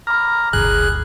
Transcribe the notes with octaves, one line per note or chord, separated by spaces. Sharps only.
A#5 B5 D6 F6
D1 G1 G#4 F#6